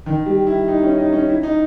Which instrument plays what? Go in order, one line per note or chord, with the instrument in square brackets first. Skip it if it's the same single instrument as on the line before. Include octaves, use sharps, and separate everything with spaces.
[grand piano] D#3
G3
E4
D#4
C#4
D#4
C#4
E4
D#4